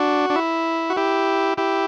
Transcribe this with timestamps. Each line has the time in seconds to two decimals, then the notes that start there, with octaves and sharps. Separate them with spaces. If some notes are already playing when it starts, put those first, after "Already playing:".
Already playing: D4 F#4
0.30 D4
0.36 E4
0.90 F#4
0.97 E4 G4
1.58 E4 G4